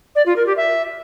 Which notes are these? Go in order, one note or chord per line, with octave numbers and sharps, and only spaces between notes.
D5
F4
A#4
G4
E5